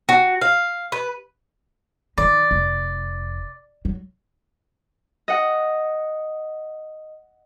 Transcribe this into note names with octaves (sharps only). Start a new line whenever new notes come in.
F#4
F5
B4
D#3 F3 D5
F1
F#3
D#5 F#5